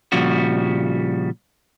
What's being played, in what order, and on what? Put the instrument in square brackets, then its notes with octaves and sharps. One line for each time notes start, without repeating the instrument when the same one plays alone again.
[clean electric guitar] A#2 C#3 F3 G3 F#4